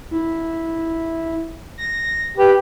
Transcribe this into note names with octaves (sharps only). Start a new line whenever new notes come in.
E4
A#6
G4 B4